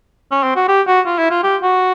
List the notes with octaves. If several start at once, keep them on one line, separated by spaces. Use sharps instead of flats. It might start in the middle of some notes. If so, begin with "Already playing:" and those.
C#4
C4
F#4
G4
F#4
F4
E4
F4
G4
F#4